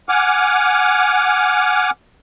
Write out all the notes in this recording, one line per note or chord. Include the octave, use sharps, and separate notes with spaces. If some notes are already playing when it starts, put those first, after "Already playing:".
F#5 G#5 D6 F6